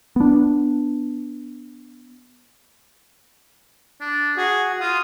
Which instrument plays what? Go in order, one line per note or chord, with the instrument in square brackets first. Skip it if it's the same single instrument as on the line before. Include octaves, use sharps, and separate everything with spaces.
[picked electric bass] B3 D4
[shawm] D4
[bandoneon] F#4 [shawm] G#4
[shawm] F4 [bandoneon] D#6